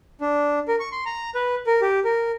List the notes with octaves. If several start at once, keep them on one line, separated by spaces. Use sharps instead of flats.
D4
A#4
C#6
C6
A#5
B4
A#4
G4
A#4